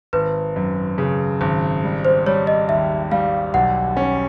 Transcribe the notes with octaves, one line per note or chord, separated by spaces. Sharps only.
G#1 B4
F#2
C#3
G#1
G3
C5
G3 C#5
D#5
D#2 E5
G3 F5
B1 F#5
C#4